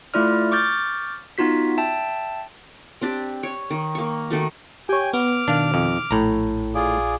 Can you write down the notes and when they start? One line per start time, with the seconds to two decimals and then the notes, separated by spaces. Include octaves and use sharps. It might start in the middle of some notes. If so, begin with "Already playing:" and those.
0.14 A3 E4 F4 D5 F6
0.52 C#6 D6 F6 G6 A6
1.38 B3 D#4 F4 F#4 B6
1.78 E5 G5 A5
3.01 C4 D4 G4
3.43 C#5
3.71 D#3
3.95 A#3 C#6
4.31 D#3 A3 F#4
4.89 G4 C#5 G5 G#5
5.13 B3 D6 F6
5.48 B2 D#3 D4 F5
5.74 F2
6.11 A#1 A2 A#5
6.75 F4 G#4 D5